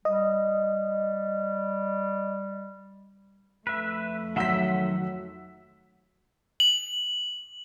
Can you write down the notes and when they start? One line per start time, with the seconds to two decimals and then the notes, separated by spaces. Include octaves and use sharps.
0.05 G3 D#5
3.67 F2 A3 B4 E5
4.36 D#3 F#3 E5 F#5 C6 E6 B6
6.60 F#7